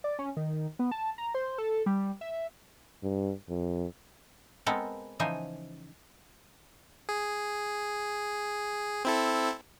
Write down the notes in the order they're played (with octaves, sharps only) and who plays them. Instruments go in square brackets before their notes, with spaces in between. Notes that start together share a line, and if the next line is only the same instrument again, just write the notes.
[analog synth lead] D5
C#4
D#3
B3
A5
A#5
C5
A4
G3
E5
[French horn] G2
F2
[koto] G#3 B3 C4 A4 A#4
C#3 E3 F3 D#4 C5 G#5
[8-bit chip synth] G#4
C4 E4 A4